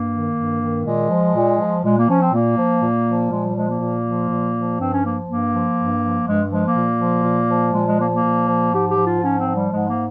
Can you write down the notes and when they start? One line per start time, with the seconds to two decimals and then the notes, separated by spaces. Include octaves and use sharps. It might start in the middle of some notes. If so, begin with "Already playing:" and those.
Already playing: G2 A#3
0.11 D#3
0.36 G2
0.61 D#3
0.85 A#2 G#3
1.10 F3
1.35 A#2
1.59 F3
1.84 A#2 G#3
1.97 A#3
2.09 F3 C#4
2.20 C4
2.32 A#2 A#3
2.57 F3
2.82 A#2
3.06 F3
3.31 A#2 G#3
3.43 G3
3.56 F3 G#3
3.68 A#3
3.80 A#2
4.05 F3
4.30 A#2
4.55 F3
4.79 G2 C4
4.91 C#4
5.03 F3 A#3
5.27 G2 A#3
5.52 F3
5.77 G2
6.02 F3
6.26 G2 G#3
6.50 F3 G#3
6.64 A#3
6.75 A#2
7.00 F3
7.24 A#2
7.50 F3
7.73 A#2 G#3
7.86 G#3
7.98 F3 A#3
8.10 A#3
8.23 A#2
8.47 F3
8.72 G#2 G4
8.88 G4
8.97 F3
9.05 F4
9.21 G#2 C#4
9.38 C4
9.46 F3
9.54 G3
9.71 G#2 G#3
9.86 A#3